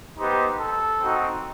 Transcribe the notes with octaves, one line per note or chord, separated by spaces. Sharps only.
B3 D#4 G4 C5
A4
C4 D#4 F#4